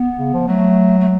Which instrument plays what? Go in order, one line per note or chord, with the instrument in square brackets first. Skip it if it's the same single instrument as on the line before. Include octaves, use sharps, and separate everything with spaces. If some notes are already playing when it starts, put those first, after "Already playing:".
Already playing: [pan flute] B3
[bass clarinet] C#3
F3
[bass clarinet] F#3 [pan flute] A3
[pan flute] A3